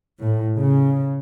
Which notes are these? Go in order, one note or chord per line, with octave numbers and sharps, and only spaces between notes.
A2
C#3